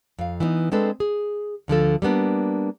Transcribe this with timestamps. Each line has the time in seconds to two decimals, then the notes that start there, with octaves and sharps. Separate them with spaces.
0.18 F2 F5
0.40 E3 B3 D4 D#4
0.72 G#3 C4 D4 A4 B4
1.00 G#4
1.68 D2 D3 F3 A4
2.02 G3 A#3 B3 D4